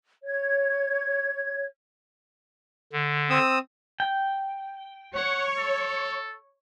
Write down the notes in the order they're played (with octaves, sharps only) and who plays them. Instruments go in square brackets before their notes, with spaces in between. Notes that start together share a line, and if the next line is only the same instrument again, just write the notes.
[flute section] C#5 G#6
[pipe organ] D3
[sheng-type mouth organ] C4 D#6 E6
[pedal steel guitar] G5
[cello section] C#5 [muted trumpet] F#5
[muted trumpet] A4